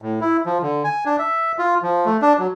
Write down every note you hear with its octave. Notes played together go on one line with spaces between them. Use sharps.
A2
E4
F3
D3
G#5
D4
E5
F4
F3
A3
D4
F#3